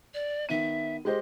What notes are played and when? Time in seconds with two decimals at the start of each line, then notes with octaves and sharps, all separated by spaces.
0.14 D5
0.49 D#3 B3 E5 D#7
1.05 G#3 G4 C5 D#5